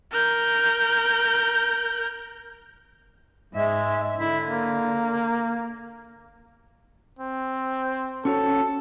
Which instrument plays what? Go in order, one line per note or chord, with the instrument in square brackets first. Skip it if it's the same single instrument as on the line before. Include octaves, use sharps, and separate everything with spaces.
[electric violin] A#4 G6
[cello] G#2 E5 [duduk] G#3
[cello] D3 [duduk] E4
[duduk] A#3
[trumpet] C4
[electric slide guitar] C#4 F#4 C#5 [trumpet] A4